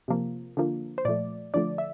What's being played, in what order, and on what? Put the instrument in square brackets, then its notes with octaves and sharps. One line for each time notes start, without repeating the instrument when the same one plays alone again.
[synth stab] C3 F3 A#3
D3 F3 A#3
C5
A#2 F3 A3 D5
D3 F3 A3 D5
E5